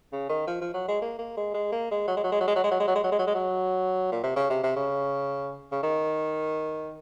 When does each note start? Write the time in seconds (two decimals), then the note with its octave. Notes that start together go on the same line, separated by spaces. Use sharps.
0.13 C#3
0.29 D#3
0.48 F3
0.61 F3
0.74 F#3
0.88 G#3
1.02 A#3
1.19 A#3
1.37 G#3
1.54 G#3
1.72 A#3
1.91 G#3
2.08 F#3
2.17 G#3
2.24 F#3
2.32 G#3
2.40 F#3
2.48 G#3
2.56 F#3
2.64 G#3
2.71 F#3
2.80 G#3
2.87 F#3
2.95 G#3
3.04 F#3
3.12 G#3
3.19 F#3
3.27 G#3
3.35 F#3
4.12 A#2
4.23 C3
4.36 C#3
4.50 C3
4.63 C3
4.76 C#3
5.72 C#3
5.83 D#3